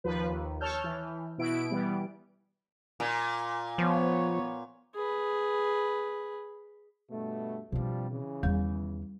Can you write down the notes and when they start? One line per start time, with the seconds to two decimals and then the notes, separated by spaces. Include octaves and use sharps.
0.04 D#2 F3 B4
0.30 D#2
0.61 C#5 A5 E6 F6 G6
0.84 E3
1.38 B2 E4 D7
1.70 E3 G3 B3
3.00 A#2
3.78 F3 B3 C#5
4.95 G#4 B4
7.10 G2 B2 A3
7.72 G2 B2 F3 G3 C4
8.10 C#3 E3
8.43 E2 D#3 G3